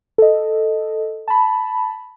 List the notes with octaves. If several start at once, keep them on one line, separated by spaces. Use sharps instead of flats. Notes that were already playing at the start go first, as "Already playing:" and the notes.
A4 D#5
A5 B5